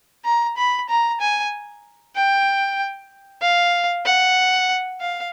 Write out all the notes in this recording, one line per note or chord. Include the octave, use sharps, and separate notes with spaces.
A#5
B5
A#5
G#5
G5
F5
F#5
F5